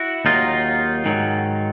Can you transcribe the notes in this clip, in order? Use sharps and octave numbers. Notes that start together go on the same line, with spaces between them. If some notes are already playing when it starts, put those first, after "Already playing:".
Already playing: E4 F#4
D#2 D#3 F#3 D#4 F4
G#2 D#3 F#3